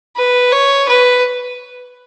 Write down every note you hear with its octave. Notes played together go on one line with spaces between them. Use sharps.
B4
C#5
B4